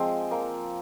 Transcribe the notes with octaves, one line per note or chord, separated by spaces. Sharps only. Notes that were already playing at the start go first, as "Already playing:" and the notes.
Already playing: F3 G#3 C4
A#3